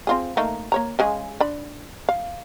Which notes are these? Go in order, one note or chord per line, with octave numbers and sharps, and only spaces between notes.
C4 F4 G#4
A3 A#3 D#4
A#3 C#5 A#5
C#3 G#3 G#4
D4 B5
F5